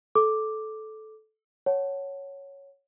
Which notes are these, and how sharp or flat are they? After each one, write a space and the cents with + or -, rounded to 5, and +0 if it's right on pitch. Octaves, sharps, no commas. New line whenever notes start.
A4 -15 D6 +0
C#5 +0 F#5 +0 A5 +0